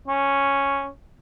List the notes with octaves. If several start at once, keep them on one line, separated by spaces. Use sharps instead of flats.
C#4